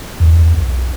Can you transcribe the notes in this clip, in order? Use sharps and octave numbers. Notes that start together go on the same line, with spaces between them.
E2
B1